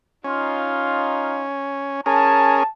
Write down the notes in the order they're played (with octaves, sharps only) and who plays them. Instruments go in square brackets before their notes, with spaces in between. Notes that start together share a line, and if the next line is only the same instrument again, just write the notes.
[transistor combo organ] C#4 [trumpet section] D#4 F4
[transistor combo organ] C#4 G#4 A#4 [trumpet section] A5